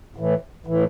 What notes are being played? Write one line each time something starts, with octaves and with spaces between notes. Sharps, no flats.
A2 E3
A2 E3